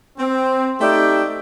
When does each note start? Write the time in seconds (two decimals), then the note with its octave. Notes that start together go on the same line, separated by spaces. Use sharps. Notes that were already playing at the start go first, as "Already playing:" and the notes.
0.18 C4
0.81 A3 D#4 G4 D5 E5 G5